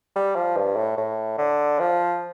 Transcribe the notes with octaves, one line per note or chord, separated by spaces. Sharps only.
G3
F3
G2
A2
A2
D3
F3